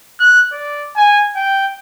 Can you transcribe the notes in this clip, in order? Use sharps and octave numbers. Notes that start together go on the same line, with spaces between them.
F#6
D5
G#5
G5